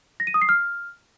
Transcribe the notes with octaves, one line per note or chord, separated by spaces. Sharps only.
A#6
D#7
D#6
C7
F6